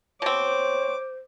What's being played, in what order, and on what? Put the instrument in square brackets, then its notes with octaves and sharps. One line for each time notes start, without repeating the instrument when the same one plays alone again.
[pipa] B2 C4 [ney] C5 [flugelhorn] C#5 [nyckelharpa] D6